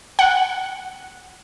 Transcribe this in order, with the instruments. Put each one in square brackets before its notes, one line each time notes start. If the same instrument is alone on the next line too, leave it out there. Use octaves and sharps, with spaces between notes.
[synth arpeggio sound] F#5